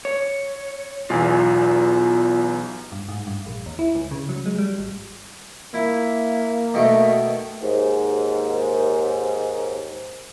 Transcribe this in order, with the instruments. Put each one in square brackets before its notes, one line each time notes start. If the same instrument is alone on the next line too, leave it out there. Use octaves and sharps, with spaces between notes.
[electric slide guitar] C#5
[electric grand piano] B1 E2 [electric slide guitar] F4 G#5
[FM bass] G2
G#2
G2
A#1
D#2
E4
C#2
C#3
F#3
G#3
G3
G#1
[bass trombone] A#3 [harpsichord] E4
[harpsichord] B2 D#3 A3
[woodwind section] D#2 G#2